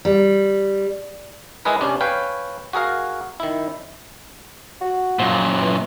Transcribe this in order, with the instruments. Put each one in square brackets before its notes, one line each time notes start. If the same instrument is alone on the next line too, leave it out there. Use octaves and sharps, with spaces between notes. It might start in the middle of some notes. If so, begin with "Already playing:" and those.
[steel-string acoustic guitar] G3
[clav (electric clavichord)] G#3 E4 G#4 A#4 B4
C3 C#4 D4
B4 C#5 F5 G5 G#5
F#4 G#4 A#4 F5
D#3 E4
[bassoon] F#4
[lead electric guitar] F#2 A#2 [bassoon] F3
[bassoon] E3